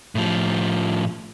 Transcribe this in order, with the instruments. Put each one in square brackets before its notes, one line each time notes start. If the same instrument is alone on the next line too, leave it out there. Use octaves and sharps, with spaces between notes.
[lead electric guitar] A2 F3